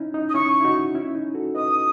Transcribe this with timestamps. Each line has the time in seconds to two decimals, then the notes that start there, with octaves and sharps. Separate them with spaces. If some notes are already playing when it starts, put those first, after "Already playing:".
Already playing: C#4 D#4 E4
0.14 D#4
0.29 D#6
0.34 C#4 E4 C#6
0.60 E4
0.64 D#4 F#4
0.95 C#4 E4
1.05 E4
1.15 D#4
1.34 F#4 A4
1.55 B4 D#5 D#6